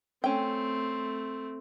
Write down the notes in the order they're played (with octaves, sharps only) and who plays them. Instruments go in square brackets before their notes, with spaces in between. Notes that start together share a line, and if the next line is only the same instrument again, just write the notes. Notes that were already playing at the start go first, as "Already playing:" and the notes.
[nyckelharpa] A3 C4 [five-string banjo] C#4 G5